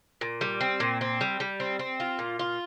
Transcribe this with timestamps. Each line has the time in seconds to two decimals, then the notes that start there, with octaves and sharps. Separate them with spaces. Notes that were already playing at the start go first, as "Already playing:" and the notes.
0.21 A#2
0.41 G3
0.61 C4
0.80 A#2
1.01 C4
1.21 G3
1.40 G3
1.60 C4
1.79 C4
2.00 F4
2.19 A#2
2.39 F4